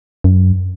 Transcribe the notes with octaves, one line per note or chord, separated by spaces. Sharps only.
F#2